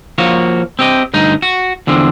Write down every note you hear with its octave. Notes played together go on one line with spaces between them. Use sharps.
F3 A#3 F#4 C#5
C4 G4 D#5
D2 G2 D#4
F#4
E2 D3 F3 C4